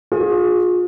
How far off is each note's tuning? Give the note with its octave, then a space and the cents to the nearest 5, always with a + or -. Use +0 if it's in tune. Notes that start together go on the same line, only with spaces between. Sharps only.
F4 +35 G#4 +0